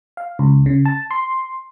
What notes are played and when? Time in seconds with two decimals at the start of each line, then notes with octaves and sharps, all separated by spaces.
0.17 F5
0.39 C#2
0.66 C#3
0.85 A5
1.11 C6